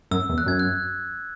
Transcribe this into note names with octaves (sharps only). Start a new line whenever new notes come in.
F#2 E6
E2
F#6
F#2 G#6
F#6